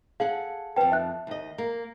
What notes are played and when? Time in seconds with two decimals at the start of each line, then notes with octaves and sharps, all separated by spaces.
0.20 G#4 A4 F5 F#5
0.76 F2 B4 G5 A5
0.92 E5 F#6
1.27 D#2 D#5
1.58 A#3